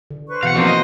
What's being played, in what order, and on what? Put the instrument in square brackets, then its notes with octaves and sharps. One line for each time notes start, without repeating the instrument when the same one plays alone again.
[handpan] D3
[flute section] B4 C5 C#6
[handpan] B2 E3 [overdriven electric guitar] F5 F#5
[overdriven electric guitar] D3 F3 [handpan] A#3 C4 A#4 [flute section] F#4 C5
[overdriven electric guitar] D#5